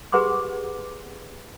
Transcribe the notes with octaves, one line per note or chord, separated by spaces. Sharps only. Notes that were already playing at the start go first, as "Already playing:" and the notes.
G4 G#4 B4 F#5 C6 D6